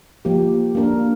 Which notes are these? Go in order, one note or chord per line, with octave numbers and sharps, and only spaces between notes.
F3 A#3 G4
A#3 D4 A#4